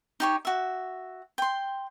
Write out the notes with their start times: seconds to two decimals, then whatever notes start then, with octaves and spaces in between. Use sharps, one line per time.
0.20 D#4 G4 C#5
0.45 F#4 E5
1.38 G5 C6